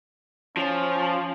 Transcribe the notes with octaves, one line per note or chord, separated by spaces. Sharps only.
F3 C#4